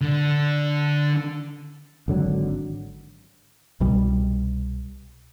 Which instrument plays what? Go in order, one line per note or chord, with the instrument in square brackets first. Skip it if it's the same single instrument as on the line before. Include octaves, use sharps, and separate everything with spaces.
[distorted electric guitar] D3
[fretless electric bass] G#1 D3 F#3
[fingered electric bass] C2 B2 G3